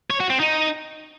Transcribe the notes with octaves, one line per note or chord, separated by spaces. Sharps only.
C#5
F#4
C4
D#4